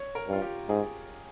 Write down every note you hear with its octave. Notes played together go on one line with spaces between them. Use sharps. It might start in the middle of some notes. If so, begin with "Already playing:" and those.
Already playing: C#5
A#4
G2 F4
G4
G#2 G#4